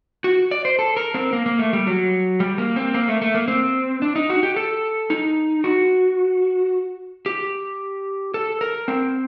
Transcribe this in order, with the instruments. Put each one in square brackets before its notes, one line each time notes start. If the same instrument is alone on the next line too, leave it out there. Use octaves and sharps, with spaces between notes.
[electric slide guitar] F#4
D5
C5
A4
A#4
C4
A#3
A#3
A3
G3
F#3
G3
A#3
C4
A#3
A3
A3
A#3
C4
D4
D#4
F#4
G4
A4
D#4
F#4
G4
A4
A#4
C4